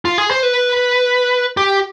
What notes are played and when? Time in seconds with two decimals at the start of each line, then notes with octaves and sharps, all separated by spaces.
0.05 F4
0.18 G#4
0.31 C5
0.43 B4
1.57 G4